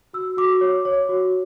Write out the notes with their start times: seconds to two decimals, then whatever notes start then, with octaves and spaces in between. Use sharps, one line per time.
0.13 F#4 E6
0.37 F#4 D6
0.61 C#5
0.85 C#5
1.09 F#4